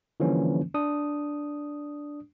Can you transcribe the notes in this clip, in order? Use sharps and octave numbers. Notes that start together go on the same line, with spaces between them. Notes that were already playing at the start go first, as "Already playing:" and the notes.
D3 E3 F3 G3 A#3 C#4
D4 D#6